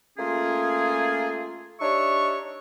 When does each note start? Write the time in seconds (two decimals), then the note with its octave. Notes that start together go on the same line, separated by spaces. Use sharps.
0.18 A3 A#3 C#4 F4 G#4
1.80 D4 D#4 G4 C#5 E5 C#6